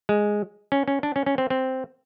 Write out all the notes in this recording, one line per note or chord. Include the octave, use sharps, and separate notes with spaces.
G#3
C#4
C#4
D4
C#4
C#4
C4
C4